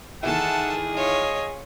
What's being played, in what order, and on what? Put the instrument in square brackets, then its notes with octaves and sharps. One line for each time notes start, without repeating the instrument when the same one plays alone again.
[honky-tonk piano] D#3 E3 E4 [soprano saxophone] G#4 [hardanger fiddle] A4 A5 [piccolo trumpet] F#5
[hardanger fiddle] F4 C#5 [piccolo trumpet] D#5